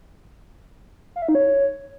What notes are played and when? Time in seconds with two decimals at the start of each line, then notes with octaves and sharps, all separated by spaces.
1.16 F5
1.22 E5
1.29 D#4
1.35 C#5